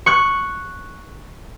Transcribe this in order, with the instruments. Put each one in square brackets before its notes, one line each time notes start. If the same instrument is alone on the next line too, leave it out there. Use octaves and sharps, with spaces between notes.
[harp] C#6 F#6